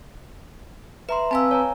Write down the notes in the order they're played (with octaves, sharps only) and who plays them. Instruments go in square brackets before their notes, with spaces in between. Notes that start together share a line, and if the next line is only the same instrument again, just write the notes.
[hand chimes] B4 A#5 C6 [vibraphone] E5
[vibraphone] C4 B4 E6 [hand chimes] F5 G#5 A5
[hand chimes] C#5 G#5 A#5